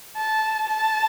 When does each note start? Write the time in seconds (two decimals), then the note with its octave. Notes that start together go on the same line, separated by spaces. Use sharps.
0.17 A5
0.69 A5